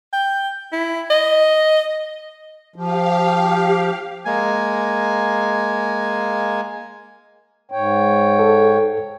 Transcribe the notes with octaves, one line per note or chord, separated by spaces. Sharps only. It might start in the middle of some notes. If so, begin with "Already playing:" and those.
G5
E4
D#5
F3 G4 F5
G#3 A#3 G#5
G#2 C#5 G5
A4